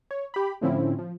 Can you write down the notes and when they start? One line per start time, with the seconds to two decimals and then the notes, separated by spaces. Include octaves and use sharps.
0.11 C#5
0.34 G4 B5
0.61 A2 D3 F3 C4 C#4 E4
0.99 F3